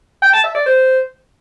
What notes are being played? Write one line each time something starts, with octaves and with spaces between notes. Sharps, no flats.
G5
A5
E5
D5
C5